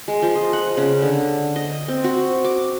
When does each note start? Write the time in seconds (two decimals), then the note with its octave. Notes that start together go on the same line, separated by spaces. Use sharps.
0.08 G#3
0.22 F3
0.35 D#5
0.53 F#5
0.77 C#3
1.02 D3
1.56 D#5
1.88 C4
2.04 F#4
2.44 D6